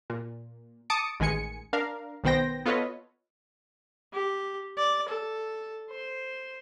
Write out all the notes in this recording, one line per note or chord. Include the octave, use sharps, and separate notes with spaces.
A#2
A5 D6 D#6 C#7 D7
A1 D#3 G#3 G#5 C#7
D4 A#4 F5
B1 D#3 B3 C5 G5 A#6
B3 F4 A4 B4 C#5 D#5
G4
D5
A4
C5